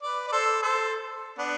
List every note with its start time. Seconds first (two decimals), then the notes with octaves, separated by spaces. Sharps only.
0.02 B4 D5
0.27 D5
0.32 A4 C5
0.62 A4 C5
1.38 B3 D4